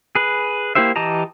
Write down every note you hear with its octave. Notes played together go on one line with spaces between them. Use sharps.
G#4 B4
A#3 E4 G4 C5 E5
E3 G4 D#5 A5 A#5